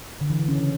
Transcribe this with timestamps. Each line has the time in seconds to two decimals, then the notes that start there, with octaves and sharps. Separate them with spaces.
0.21 D3
0.30 E3
0.39 D3
0.48 C#3 C#4
0.58 C#3 C#4